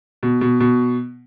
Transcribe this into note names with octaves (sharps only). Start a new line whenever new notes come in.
B2
B2
B2